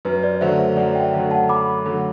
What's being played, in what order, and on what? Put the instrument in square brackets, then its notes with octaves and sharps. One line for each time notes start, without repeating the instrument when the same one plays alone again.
[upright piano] F#2 [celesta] B4
[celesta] B4 D5
[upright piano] D3 F#3 A3 [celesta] C5 E5
[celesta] C5 E5
[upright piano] F#2 [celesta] D5 F#5
[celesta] E5 G5
[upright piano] D3 F#3 A3
[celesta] F#5 A5
[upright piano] F#2 [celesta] B5 D6
[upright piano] D3 F#3 A3